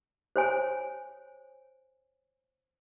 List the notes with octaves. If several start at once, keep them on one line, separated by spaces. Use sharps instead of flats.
C5 C#5 G#5